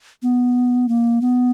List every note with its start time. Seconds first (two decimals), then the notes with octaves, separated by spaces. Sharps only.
0.23 B3
0.88 A#3
1.21 B3